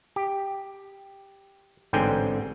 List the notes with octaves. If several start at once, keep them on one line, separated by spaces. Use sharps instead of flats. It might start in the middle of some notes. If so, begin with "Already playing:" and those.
G4
A1 G#2 D3 C4 G5 G#5